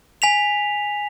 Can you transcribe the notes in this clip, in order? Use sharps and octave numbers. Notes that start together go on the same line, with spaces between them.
G#5 B6 F7